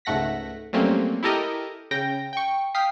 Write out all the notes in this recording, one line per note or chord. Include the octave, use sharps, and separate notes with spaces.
C#2 G#2 A3 F#5 A#6 B6
F#3 G3 A3 A#3 C4 C#4
E4 G4 A4 A#4 D#5
C#3 G5 A#6
G5 C#6
F5 G5 D#6 B6 C7